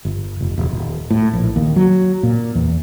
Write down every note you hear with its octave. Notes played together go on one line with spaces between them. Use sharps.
G1
F1
E1
D#1
A2
A#1
D#2
F#3
A#2
E2